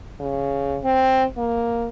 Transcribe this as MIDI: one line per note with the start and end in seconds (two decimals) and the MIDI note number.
0.20 0.78 49
0.84 1.24 60
1.37 1.88 58